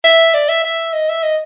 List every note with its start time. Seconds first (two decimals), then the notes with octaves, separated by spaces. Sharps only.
0.04 E5
0.34 D5
0.49 E5
0.64 E5
0.93 D#5
1.09 E5
1.23 D#5